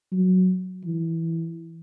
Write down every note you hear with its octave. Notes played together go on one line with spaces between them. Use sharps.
F#3
E3